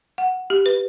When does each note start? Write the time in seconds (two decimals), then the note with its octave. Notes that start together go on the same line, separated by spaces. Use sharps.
0.18 F#5
0.50 G4
0.66 B4